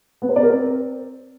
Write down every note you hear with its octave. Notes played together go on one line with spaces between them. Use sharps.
B3
C5
D5
A#4
C4